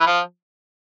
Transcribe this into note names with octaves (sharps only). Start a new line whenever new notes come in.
E3
F3